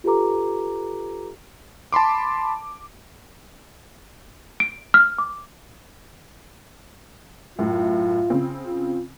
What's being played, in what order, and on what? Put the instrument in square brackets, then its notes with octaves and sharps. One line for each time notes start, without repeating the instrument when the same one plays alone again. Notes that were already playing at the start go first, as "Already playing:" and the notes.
[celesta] F4 G4 A4 B4 A#5 D6
[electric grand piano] A5 B5 C6 D6
[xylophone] D7
F6
D6
[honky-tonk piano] F#2 A2 [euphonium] F4
[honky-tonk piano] C#3 C4
[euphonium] F4